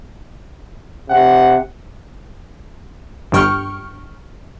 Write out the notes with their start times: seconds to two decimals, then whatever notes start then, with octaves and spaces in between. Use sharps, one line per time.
1.10 C3 F#5
3.32 G1 G2 G5 C#6 F6